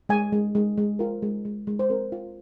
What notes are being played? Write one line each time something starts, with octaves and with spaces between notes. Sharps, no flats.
G#3 G#5
G#3
G#3
G#3
F4 A#4
G#3
G#3
G#3
C5
C4 A#4
F4